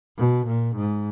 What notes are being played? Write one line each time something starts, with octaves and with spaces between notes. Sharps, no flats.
B2
A#2
G#2